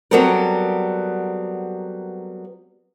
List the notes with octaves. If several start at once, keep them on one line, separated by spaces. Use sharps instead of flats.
F#3 G3 B3 C4 A4 A#4